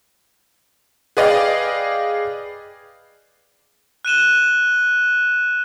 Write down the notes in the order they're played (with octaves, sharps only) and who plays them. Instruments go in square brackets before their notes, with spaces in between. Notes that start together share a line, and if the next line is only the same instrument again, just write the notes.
[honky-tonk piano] G#4 B4 D5 D#5 F5 G5
[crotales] F#6 D#7 E7 G7